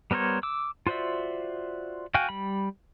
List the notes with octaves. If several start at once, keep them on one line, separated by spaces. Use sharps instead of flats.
G3 B3 A#4 C5 C#5
D6 E6
F4 F#4 C5 D5 E5
F#4 F5 G5 G#5
G3 B5